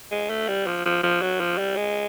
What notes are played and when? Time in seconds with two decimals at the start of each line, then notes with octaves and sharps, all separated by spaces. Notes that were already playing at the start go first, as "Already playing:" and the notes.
0.11 G#3
0.30 A3
0.48 G3
0.67 F3
0.85 F3
1.03 F3
1.22 F#3
1.40 F3
1.58 G3
1.76 G#3